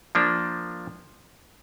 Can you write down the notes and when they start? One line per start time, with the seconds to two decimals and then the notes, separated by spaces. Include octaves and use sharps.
0.15 F3 A#3 D4